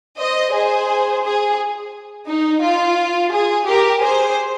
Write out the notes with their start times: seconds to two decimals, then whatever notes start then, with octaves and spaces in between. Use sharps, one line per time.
0.18 C5 D#5
0.53 G#4 C5
1.23 G#4
2.27 D#4
2.62 F4
3.32 G#4
3.67 G4 A#4
4.02 G#4 C5